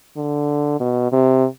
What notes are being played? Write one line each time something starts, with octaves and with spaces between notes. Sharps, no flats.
D3
B2
C3